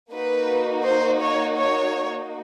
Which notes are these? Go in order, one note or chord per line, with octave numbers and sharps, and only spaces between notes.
A#3 D#4 F#4 B4
C5
C#5
C#5